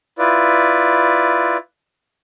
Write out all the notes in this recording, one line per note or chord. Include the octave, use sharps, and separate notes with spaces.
E4 F4 B4 D5